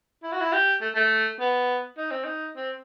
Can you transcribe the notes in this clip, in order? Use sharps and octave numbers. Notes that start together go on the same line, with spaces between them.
E4
F#4
E4
G4
A3
A3
B3
D#4
C4
D#4
C4